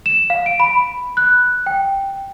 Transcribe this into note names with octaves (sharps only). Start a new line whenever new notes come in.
E7
F5
D7
B5
F#6
G5